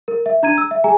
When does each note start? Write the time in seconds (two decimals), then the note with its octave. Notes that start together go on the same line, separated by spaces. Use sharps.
0.08 A#4
0.26 E5
0.43 D4 A#5 G#6 D#7
0.58 E6
0.71 E5
0.84 G#4 G#5 A#5